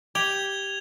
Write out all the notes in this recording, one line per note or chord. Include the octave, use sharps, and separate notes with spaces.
G4 G#6 F7 G7